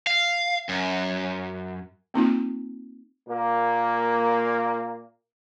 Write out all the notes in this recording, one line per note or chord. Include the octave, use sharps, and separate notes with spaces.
F5
F#2
A#3 C4 D#4 F4
A#2 A#3